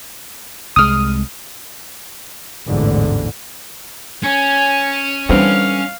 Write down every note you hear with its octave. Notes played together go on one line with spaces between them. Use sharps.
C2 G#3 D#6 F6
A1 E2 G#2 D3
C#4 G#5
D3 E3 G3 C4 F5